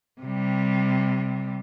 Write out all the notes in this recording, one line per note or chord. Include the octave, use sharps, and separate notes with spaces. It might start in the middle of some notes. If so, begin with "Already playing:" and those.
C3 G3